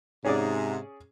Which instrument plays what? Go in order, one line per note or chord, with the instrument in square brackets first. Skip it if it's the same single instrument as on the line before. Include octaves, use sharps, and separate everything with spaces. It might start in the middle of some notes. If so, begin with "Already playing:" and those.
[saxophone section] G#2 [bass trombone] C3 [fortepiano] C#4 G#4 D5